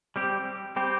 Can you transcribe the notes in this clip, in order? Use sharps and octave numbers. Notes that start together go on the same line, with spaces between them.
G3 C4 G4
G3 C4 G4